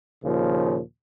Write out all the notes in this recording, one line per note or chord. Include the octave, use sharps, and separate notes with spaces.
D#2 A#2 C#3 F3